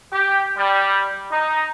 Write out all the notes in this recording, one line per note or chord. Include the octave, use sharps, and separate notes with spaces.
G4
G3
D#4